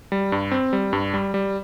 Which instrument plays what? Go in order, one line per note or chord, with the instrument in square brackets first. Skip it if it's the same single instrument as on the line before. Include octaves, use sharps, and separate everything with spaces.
[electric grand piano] G3
G2
C4
G3
G2
G3
G3